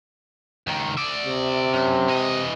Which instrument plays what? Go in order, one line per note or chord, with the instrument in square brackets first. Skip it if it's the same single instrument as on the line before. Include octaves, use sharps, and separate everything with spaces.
[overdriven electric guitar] C#2 D#3
D5 E5
[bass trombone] C3
[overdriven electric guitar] F#2
E3 D#5